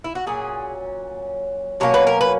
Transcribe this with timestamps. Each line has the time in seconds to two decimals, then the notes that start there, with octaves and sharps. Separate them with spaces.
0.04 E4
0.15 F#4
0.27 A#2 F#3 C#4 G#4
1.80 B2 F#3 A#3 C#4 C#5
1.94 B4
2.07 A#4
2.21 B4